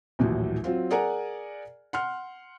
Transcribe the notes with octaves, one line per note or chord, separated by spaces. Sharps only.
A#1 D#2 A2 E3 F#3
F#3 C4 F4
G#4 A#4 D5 F#5 G#5 A#5
F#5 C6 F6